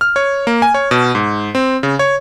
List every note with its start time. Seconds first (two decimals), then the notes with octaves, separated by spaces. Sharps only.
0.01 F6
0.16 C#5
0.47 A#3
0.62 G#5
0.74 C#5
0.91 B2
1.15 G#2
1.55 C4
1.83 C#3
1.99 C#5